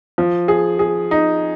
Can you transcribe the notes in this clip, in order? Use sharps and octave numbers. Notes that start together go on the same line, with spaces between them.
F3
G#4
G#4
D#4